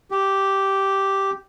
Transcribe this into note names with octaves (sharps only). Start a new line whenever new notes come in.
G4